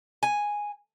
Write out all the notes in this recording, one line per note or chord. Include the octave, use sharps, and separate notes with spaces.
G#5